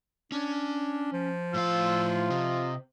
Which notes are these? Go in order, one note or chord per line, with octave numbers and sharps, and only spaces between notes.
C#4 D4
F3
A2 F4 F5 E6
C3 D#5